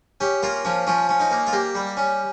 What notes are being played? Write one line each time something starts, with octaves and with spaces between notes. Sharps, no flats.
C#4 G4
A#3 F4
F3 C#4
F3 C#4
C#4
D#4
A#3
F4
A#3 G4
G3
C#4